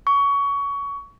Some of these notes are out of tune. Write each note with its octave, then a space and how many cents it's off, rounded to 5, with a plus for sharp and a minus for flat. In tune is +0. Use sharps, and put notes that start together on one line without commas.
C#6 +20